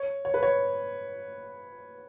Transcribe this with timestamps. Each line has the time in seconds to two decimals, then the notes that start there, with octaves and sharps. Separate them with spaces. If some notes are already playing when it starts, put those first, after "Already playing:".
Already playing: C#5
0.25 C#5
0.34 B4
0.43 C#5